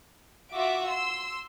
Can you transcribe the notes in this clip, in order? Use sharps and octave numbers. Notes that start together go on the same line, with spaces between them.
F4 F#4 E5 D6
C6 E6